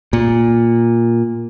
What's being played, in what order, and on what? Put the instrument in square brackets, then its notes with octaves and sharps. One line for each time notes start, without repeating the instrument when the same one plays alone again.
[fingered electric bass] A#2